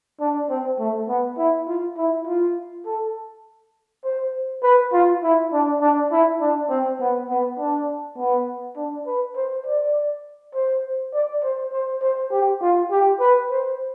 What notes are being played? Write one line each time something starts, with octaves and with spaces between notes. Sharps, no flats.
D4
C4
A3
B3
E4
F4
E4
F4
A4
C5
B4
F4
E4
D4
D4
E4
D4
C4
B3
B3
D4
B3
D4
B4
C5
D5
C5
D5
C5
C5
C5
G4
F4
G4
B4
C5